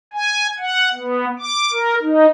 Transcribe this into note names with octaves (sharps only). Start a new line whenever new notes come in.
G#5
F#5
B3
D6
A#4
D#4